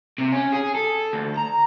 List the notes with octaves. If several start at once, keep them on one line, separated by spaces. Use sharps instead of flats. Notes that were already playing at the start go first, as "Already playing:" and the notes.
C3
C#4
G#4
A4
D2
A#5